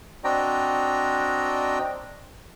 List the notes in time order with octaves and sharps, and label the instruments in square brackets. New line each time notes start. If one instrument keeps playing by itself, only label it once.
[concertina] C4 D4 F#4 D#5 G5 A#5